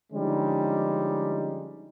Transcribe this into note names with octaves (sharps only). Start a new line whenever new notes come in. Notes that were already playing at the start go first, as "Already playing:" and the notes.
D3 F3 G3 G#3 C#4 D#4